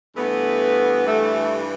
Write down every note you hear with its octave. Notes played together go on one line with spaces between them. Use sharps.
G2 E3 A3 B3
A3